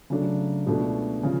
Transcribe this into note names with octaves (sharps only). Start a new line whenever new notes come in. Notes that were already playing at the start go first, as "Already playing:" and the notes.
C#3 F#3 A3 D4
C#2 B2 A3 D4 F#4
C#3 F3